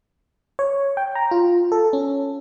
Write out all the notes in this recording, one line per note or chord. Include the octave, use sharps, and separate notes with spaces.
C#5
G5
A#5
F4
A4
C#4